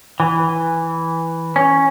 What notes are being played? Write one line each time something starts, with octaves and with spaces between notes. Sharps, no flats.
E3
C#4